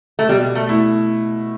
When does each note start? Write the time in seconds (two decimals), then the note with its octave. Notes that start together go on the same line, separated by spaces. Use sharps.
0.19 A3
0.29 B2 G3
0.55 A3
0.67 A3 E4